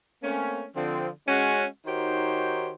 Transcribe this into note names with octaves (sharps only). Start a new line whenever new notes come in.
A3 A#3 C4 C#4
D3 F3 C4
G#3 C#4 F#4
D#3 D#4 F#4 G4 C5 C#5